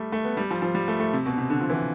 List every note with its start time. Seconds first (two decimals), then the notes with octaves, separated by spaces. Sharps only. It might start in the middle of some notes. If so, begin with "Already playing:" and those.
Already playing: G3 A3
0.12 A3
0.24 B3
0.37 G3
0.51 F3
0.62 F3
0.75 G3
0.88 A3
1.00 A3
1.13 C3
1.26 B2
1.38 C3
1.50 D3
1.61 F3
1.69 E3